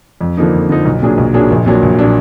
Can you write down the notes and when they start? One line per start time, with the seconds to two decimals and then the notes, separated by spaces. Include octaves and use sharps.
0.21 F2
0.37 D3 F3 A#3 D#4
0.54 F2
0.69 D3 F3 A#3 D#4
0.85 B1
1.02 A#2 F#3 D4 G#4
1.18 B1
1.34 A#2 F#3 D4 G#4
1.50 A#1
1.66 A#2 F#3 D4
1.83 A#1
1.99 A#2 F#3 D4